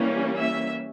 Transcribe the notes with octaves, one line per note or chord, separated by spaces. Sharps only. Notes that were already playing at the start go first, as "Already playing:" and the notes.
Already playing: E3 G3 A#3 C#4
E5